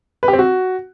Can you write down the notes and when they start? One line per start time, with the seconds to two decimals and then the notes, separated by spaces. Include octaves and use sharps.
0.23 B4
0.28 G4
0.33 C4
0.39 F#4